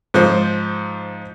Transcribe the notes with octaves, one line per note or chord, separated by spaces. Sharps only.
G#2 F3 C5